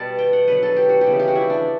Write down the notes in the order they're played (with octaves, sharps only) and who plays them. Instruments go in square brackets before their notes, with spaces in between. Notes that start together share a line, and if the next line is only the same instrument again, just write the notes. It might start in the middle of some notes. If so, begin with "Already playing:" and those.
Already playing: [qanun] B2 G3 B3 A5
G5
F#5
D3 F#3 B3 B4
A4
G4
F#4
G4
C#3 E3 G3 B3
G4
F#4
E4
D4